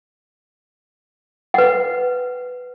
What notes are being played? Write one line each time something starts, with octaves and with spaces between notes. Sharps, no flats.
B4 F#5